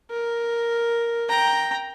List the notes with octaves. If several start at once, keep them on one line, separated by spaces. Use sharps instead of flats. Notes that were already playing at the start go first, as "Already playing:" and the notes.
A#4
G5 A#5